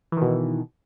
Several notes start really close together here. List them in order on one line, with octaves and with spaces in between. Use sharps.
E3 D#3 B2